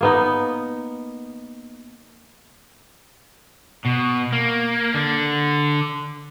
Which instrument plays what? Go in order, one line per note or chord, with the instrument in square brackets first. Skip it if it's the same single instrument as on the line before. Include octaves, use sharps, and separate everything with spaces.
[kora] A#3 B3 D#4
[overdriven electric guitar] B2
A#3
D3